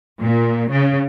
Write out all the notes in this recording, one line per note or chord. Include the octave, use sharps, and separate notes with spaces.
A#2
C#3